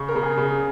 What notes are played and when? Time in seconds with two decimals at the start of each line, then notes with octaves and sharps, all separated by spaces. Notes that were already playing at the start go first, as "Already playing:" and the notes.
Already playing: C#3 C#6
0.09 A#4
0.15 C#3
0.23 G#4
0.37 C#3